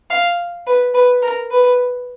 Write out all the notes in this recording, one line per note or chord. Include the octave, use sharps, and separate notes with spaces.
F5
B4
B4
A#4
B4